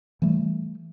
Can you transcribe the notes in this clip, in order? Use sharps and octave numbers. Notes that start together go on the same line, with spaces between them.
E3 G3 A3